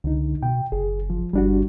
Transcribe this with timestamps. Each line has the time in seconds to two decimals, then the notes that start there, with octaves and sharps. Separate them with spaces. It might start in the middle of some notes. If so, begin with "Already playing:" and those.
0.04 C#2 D3 D#4
0.43 B2 G5
0.72 F#1 G#4
1.10 F3
1.33 G1 G3 D4 F#4